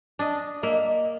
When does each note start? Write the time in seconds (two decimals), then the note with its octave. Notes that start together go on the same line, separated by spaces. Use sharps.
0.19 D4 D#5
0.63 A#3 D#5 E5